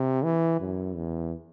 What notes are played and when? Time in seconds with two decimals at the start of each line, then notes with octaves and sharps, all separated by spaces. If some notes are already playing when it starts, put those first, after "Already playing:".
Already playing: C3
0.24 E3
0.60 F#2
0.96 E2